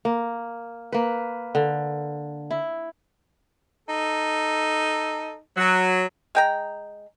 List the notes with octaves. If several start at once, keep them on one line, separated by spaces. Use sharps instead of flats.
A#3
A#3 B4
D3
E4
D#4 A4
F#3
G#3 G5 A#5